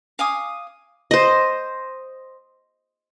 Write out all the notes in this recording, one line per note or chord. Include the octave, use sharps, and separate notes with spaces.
F5 G#5 D6 D#6
C5 D#5